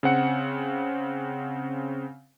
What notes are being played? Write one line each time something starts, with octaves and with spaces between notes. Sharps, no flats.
C#3 C4 F#5 C#7